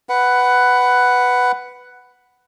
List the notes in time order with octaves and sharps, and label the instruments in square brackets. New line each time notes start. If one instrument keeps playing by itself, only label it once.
[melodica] B4 F#5